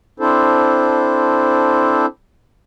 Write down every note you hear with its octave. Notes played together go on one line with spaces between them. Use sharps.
C4 D4 E4 A4 C5